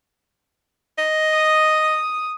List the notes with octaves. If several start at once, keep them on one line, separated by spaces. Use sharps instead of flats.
D#5
D#6